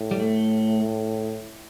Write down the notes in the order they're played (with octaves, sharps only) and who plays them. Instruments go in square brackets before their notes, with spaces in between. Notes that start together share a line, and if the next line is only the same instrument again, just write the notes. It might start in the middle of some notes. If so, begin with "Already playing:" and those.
Already playing: [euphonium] A2
[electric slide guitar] G3
A3